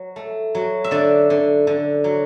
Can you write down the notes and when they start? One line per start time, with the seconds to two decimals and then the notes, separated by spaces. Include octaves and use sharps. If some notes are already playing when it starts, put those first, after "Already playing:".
Already playing: F#3
0.16 A3
0.55 F#3
0.84 E5
0.91 D3 D5
1.30 D3
1.67 D3
2.04 F#3